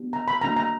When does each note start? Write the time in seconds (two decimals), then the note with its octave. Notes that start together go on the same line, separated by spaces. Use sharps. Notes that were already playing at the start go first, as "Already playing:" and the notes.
Already playing: B3 D4 G4
0.13 A#5
0.28 B5
0.41 A#3 D4 F#4 A#5
0.56 A#5